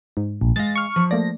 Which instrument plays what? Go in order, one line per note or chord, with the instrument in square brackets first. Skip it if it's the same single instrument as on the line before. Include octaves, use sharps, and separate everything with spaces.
[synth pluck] G#2
[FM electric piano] A#1
[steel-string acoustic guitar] G#3 F5 [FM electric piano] A6 A#6
[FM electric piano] C#6 F6
[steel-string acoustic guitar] F3
[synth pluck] A3 A#3 D5 [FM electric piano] A#6